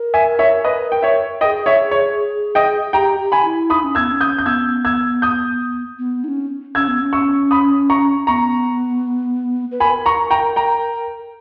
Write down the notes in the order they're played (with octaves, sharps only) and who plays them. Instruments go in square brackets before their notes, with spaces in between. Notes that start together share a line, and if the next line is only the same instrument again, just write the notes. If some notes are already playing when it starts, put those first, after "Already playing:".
Already playing: [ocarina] A#4
[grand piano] E5 G#5
C#5 E5
B4 D#5
G5
C#5 E5
[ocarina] A#4 [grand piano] D#5 G5
[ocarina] G#4
[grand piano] C#5 E5
C#5
D#5 G5
[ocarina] G4 [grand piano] G5 A#5
[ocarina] G4
[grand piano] G#5 B5
[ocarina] E4
[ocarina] D#4 [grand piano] B5 D#6
[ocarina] C#4
[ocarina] B3 [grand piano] E6 G#6
[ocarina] C#4
[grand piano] D#6 G6
G6
[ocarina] B3 [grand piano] E6 G#6
[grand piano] E6 G#6
D#6 G6
[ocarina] B3
D#4
C#4
[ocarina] C#4 [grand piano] E6 G#6
[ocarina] B3
C#4
[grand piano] C#6 E6
B5 D#6
A#5 C#6
[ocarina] B3 [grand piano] A#5 C#6
[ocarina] B4
[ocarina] A#4 [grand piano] G#5 B5
[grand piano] A#5 C#6
G5 A#5
G5 A#5